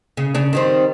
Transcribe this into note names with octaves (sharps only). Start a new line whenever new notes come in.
C#3
C#3 D4
D#3 G3 C4